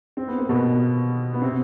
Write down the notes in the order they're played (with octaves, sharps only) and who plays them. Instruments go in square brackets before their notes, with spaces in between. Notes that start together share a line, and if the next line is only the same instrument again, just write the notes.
[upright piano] C4
B3
A#3
B2 B3
B3
C3 C4